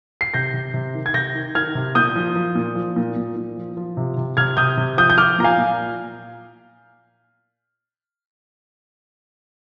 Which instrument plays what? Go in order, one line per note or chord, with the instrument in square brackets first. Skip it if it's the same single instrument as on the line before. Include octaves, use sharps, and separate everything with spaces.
[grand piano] C7
C3 G6 A#6
C3
C3
D#3
G#6
C3 G6 A#6
D#3
D#3 F6 G#6
C3
A#2 D#6 G6
F3
F3
A#2
F3
A#2
A#2
A#2
F3
F3
C3
C3
C3 F6 G#6
C3 D#6 G6
C3
F3 D#6 G6
G6
F3 D6 F6
A#2 A#5
F5 G#5
A#2